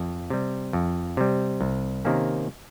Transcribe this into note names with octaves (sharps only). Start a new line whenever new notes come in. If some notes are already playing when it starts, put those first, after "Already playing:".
Already playing: F2
C3 G3
F2
C3 G3
C2
C3 D#3 A#3 C#4